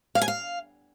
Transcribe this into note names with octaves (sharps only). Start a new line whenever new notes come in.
F5
G#5
F5